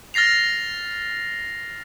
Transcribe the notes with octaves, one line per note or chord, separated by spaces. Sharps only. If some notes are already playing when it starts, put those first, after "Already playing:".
F6 A6 A#6 C7 F7